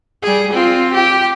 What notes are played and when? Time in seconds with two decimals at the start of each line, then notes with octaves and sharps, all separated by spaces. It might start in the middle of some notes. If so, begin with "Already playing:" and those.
0.22 G3 G#4
0.52 C4 F4
0.94 G4